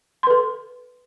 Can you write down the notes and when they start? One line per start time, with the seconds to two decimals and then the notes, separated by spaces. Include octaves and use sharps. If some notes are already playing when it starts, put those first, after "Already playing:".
0.23 C6
0.27 B4
0.30 A4